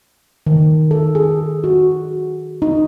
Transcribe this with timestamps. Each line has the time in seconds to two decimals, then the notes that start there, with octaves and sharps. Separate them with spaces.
0.46 D#3
0.91 A4
1.15 G#4
1.64 F#4
2.62 D#4